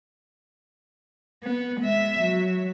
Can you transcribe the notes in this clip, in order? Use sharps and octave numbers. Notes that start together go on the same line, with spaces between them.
B3
G#3 E5
F#3